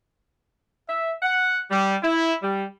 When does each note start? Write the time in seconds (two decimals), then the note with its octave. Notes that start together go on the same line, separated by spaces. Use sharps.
0.89 E5
1.22 F#5
1.71 G3
2.03 E4
2.43 G3